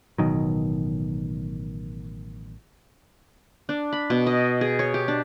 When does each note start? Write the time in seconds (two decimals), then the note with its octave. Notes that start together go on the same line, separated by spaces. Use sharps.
0.18 A1 B2 D#3 F#3
3.69 D4
3.93 B5
4.10 B2
4.27 D#5
4.61 G#4
4.79 C#5
4.94 G4
5.08 D4